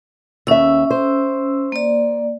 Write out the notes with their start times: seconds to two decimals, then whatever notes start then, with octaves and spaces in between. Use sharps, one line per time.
0.47 D#2 C#4 E5 E6
0.91 C5
1.72 A#3 D5